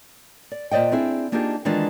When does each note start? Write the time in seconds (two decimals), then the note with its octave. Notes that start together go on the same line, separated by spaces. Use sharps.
0.51 D5
0.71 A#2 C5 D5 D#5 G5
0.92 C4 D4 E4 G#4
1.32 A#3 D4 D#4 F4 G4 G#4
1.65 D#3 E3 G#3 D4 F4